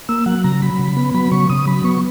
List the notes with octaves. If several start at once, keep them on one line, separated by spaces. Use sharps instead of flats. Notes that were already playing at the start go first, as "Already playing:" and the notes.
A#3 E6
F#3 F#5
C#3 A#5
F#3 B5
C#3
B3
F#3 B5
C#3 C#6
C#3 D#6
F#3 B5
B3 C#6